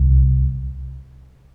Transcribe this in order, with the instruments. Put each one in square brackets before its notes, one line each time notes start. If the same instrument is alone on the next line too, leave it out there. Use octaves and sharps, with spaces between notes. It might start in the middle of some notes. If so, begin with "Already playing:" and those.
Already playing: [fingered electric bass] C2